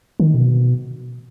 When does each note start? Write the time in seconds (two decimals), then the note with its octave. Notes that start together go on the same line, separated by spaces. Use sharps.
0.20 D#3
0.34 B2